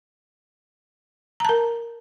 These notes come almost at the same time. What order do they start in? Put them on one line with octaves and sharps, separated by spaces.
A#5 A5 A#4